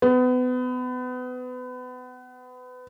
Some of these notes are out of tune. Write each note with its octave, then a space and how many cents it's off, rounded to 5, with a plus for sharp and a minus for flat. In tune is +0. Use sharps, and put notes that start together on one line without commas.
B3 +30